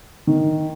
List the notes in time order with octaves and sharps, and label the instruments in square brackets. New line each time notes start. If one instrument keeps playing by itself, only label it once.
[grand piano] D#3